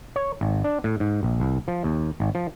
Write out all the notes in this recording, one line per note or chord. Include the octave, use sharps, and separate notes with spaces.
C#5
G#1
D4
A2
G#2
A#1
C2
F3
D#2
G#1
F3